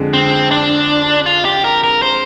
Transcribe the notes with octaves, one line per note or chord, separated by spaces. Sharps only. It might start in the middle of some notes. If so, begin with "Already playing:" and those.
Already playing: F2 D3 G#3
C4
D4
F4
G4
A#4
A#4
C5